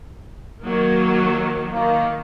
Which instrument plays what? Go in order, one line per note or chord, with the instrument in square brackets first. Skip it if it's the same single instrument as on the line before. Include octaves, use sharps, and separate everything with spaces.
[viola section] D#3 F#3 A#3
[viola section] D#3 [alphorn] A#3